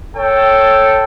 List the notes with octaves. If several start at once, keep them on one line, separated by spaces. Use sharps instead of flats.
A4 C#5 G5